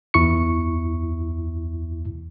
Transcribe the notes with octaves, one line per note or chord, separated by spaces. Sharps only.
E2 E4 C#6 C#7